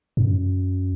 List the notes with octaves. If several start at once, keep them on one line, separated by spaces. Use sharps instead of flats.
F#2